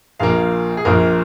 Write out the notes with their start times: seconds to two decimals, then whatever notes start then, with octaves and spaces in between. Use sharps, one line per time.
0.20 A#1 A#2 A#3 F5
0.77 G#4
0.85 A#1 A#2 A#3 A#4